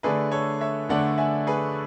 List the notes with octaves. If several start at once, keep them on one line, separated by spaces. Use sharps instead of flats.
D3 A3 D4 G#4 B4
A4 C#5
C#5 E5
D3 A3 D4 D5 F#5
E5 G#5
G#4 B4